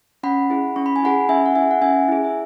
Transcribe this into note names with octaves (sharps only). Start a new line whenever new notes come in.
C#4 F#5 B5
E4 G#4
C#4 C#6
B5
G#5
E4 G#4 F#5 B5
C#4 E5 G#5
F#5
E4 G#4 E5 G#5
F#5
C#4 E5 G#5
E4 G#4
E5